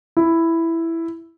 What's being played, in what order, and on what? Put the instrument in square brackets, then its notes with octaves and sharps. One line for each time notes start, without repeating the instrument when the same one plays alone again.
[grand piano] E4